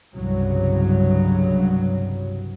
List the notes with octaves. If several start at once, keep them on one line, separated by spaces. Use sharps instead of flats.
C2 G2 C#3 F#3